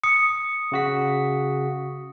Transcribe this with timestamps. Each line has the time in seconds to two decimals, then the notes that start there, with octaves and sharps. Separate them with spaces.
0.04 D#6 C#7
0.72 C#3 F#4 B6